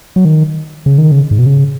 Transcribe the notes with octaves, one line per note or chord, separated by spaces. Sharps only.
F#3
D#3
C#3
D#3
C#3
G#2
B2
C#3